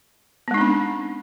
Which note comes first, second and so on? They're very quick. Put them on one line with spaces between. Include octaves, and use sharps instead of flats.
B3 G#3 D#4 C4 D4